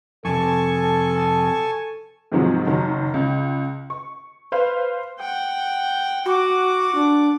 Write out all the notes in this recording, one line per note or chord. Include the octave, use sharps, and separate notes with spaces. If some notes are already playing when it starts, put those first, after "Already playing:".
F2 C3 A4 G#5 A5 C#6
G#2 C3 D#3 F3 F#3 G#3
F#1 D#3 F#3
C#2
C#6
B4 C5 F5
F#5 G5
F#4 F#5 D6
D4